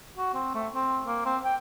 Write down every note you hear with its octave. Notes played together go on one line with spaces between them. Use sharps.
F#4
C4
A3
C4
A#3
C4
G5